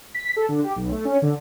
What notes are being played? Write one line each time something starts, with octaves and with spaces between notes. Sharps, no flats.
B6
A4
D3
G4
B1
A3
C#4
D3